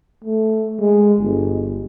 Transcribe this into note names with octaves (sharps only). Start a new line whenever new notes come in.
A3
G#3
G1